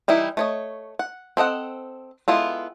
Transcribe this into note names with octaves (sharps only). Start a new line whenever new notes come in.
E3 G3 D#4 E4
A3 C#5 D#5
F#5
C4 A4 D#5 F#5
G#3 B3 E4 F4 A4